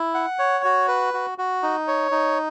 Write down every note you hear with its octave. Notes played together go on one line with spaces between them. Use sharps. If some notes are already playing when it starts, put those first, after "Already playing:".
Already playing: E4
F#5
C#5
F#4
B4
F#4
F#4
D#4
C#5
D#4